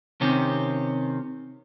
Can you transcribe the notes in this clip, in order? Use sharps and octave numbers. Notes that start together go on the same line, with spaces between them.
C3 D#3 C4 C#4 G4